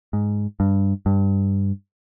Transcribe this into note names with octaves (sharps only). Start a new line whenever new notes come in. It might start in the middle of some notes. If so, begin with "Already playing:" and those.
G#2
G2
G2